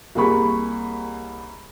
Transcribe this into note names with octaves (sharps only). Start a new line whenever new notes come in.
C2 A#3 G#4 B5 C#6